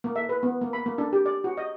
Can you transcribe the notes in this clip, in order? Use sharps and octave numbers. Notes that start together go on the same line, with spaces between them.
A#3
E5
B4
B3
A#3
B5
A#3
D4
G4
D5
F#4
D#5